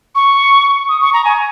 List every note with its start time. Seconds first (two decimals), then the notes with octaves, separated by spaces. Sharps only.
0.15 C#6
0.89 D#6
1.01 C#6
1.13 A#5
1.25 G#5